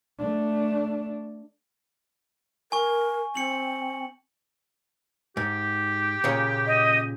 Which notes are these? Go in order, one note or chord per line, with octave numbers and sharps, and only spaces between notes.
A3 D4
A#4 G#5 C#6
C4 C#7 F#7
G#2 G4
A#2 C#3 C#4
D#5